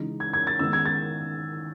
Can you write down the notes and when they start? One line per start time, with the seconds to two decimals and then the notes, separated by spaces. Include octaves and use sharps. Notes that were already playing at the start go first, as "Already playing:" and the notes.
Already playing: C#3 E3 G#3 D#4
0.20 G#6
0.34 G#6
0.47 A6
0.59 D#3 G#3 B3 D#4 E6
0.73 G#6
0.85 A6